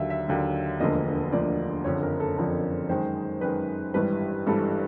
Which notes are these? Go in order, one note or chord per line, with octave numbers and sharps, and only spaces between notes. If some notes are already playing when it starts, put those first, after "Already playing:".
Already playing: D#2 D3 F#3 E5
E5
D#2 D3 F#3
E1 D2 D3 F3 A#3 D#5
E1 D2 D3 F3 A#3 D5
F#1 F2 D3 F3 C#5
A#4
A4
F#1 F2 D3 F3 A#4
F#2 D#3 G#3 C5
F#2 D#3 G#3 B4
G#1 G2 E3 G3 B4
G#1 G2 E3 G3 A4